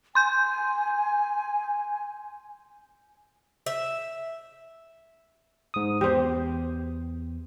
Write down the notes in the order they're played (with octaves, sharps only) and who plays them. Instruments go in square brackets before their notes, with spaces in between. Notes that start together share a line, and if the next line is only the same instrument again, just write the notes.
[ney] G#5 [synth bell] C6 G6
[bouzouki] E5
[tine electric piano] G#2 D#6
[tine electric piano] E2 [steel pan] G4 C5